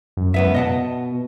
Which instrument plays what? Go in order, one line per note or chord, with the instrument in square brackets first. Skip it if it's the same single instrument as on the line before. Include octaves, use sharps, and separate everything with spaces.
[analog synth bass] F#2
[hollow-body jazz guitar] C#2 B3 E5 [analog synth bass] F#2
[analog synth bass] B2 [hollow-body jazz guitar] D#5 F#5 A5